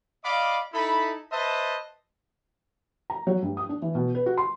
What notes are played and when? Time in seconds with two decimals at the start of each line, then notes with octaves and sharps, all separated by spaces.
0.23 D5 D#5 F5 B5 D6
0.73 D#4 E4 A4 B5
1.31 B4 C5 D#5 E5 A5
3.10 A#5
3.27 F#3
3.42 G2
3.57 D#6
3.69 D4
3.82 E3
3.95 B2
4.15 B4
4.26 F#4
4.38 C6